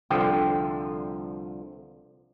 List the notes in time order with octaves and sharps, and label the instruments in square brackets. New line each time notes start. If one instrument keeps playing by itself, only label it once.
[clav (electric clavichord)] C2 D3 F3 [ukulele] A4 C5 G5